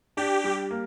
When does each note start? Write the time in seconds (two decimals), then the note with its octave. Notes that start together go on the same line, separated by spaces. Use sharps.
0.17 D4 G4
0.44 G3
0.71 A#3